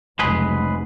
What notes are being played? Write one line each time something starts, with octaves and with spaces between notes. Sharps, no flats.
F1 C#2 F#3 G#3 G#4 B4